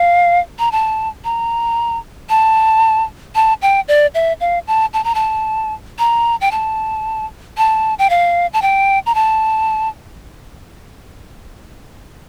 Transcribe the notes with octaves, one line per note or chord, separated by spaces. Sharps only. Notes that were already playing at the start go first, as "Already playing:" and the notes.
Already playing: F5
A#5
A5
A#5
A5
A5
G5
D5
E5
F5
A5
A5
A#5
A5
A#5
G5
A5
A5
G5
F5
A5
G5
A#5
A5